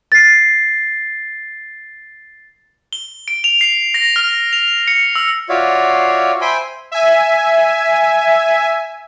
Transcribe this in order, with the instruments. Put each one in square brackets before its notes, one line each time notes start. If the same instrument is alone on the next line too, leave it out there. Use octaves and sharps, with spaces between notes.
[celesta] A6 C7
[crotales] G7
D7
F7
C7
A#6
F6
F7
C#7
E6
[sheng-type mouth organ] F4 F#4 C#5 D5 E5 F5
C5 E5 G5 G#5 B5 C6
[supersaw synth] E5 G#5